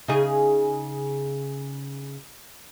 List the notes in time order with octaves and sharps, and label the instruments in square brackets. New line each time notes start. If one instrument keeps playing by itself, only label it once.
[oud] C#3 D#4 G#4